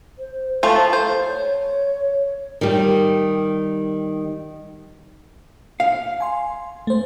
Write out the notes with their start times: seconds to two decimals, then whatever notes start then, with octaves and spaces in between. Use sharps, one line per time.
0.19 C5
0.63 F3 A3 F4 A4
0.93 C5
1.28 C#5
2.61 D#3 G3
5.80 F5
6.20 G#5 C6
6.87 A3 C5